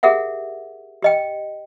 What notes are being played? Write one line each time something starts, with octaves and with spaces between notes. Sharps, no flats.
G4 G#4 A#4 E5 F#5
G4 D#5 G5